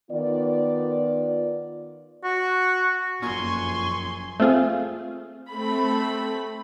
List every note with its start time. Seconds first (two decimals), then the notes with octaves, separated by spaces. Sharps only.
0.11 D#3 B3 F4 D5
2.24 F#4
3.22 F#1 F2 A#2 G#5 C6 C#6
4.40 A3 C4 F4 G#4
5.48 A3 C4 B5